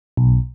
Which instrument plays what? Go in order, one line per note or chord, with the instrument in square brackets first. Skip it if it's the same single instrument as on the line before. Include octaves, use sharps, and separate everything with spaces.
[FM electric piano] B1